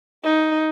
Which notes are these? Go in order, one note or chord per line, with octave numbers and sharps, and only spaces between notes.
D#4